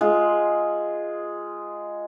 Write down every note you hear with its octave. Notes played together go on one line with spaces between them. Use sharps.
G#3 F4